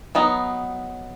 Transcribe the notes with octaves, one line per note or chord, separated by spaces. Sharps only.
F#3 B3 D#4